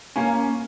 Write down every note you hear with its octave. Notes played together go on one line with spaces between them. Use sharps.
A#3 C#4